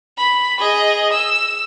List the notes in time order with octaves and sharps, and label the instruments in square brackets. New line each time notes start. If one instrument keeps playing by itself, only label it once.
[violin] B5
G#4 D#5
E6